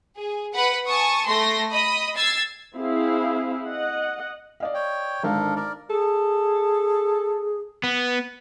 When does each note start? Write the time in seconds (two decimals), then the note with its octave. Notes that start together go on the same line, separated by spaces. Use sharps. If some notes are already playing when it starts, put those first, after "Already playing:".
0.16 G#4
0.54 B4 F#5 B5
0.88 G#5 A5 C#6 D#6
1.28 A3 C6 A#6
1.71 D#5 B5 D#6
2.16 E6 G#6 A6 C7
2.75 C4 E4 G#4 F5
3.67 D#5 F#5
4.60 D5 D#5 F5
4.74 C#5 G5
5.23 G#1 D3 D4 A4 A#4 F5
5.56 A#4 D5
5.90 G#4 A4
7.83 B3